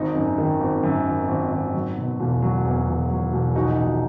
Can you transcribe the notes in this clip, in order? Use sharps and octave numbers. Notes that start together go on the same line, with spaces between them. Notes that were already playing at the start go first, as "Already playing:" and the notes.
Already playing: G#1 D#4
F#2
D#3
G#1
F#2
G#1
G#1
G#1
F#3
B2
E1
F#3
E2
E1
F#3
E1
A#1 D#4 F#4
A#1